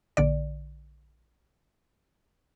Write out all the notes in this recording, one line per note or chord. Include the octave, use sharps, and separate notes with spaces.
A#1 D3 D5